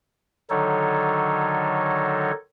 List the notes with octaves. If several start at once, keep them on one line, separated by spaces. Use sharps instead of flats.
D3 D#3 F#3 D#4 A4 C#5